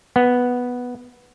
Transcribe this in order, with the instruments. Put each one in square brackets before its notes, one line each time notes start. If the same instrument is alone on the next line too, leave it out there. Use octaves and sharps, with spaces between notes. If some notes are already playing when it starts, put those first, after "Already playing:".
[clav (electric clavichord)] B3